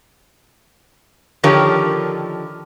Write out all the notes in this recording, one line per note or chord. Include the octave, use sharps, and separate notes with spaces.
D3 D#3 F3 G4 A#4 C#5